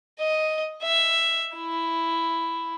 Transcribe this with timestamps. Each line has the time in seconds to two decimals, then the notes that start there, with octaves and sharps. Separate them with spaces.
0.19 D#5
0.82 E5
1.56 E4